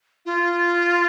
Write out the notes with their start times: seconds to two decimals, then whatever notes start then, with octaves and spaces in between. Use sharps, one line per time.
0.25 F4